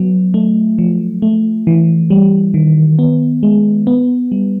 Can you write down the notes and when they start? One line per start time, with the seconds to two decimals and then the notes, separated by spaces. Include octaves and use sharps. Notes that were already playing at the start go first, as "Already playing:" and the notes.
Already playing: F#3 B3
0.34 A3
0.79 F3
1.22 A3
1.67 E3
2.10 G3
2.54 D#3
2.99 B3
3.43 G#3
3.87 B3
4.32 G3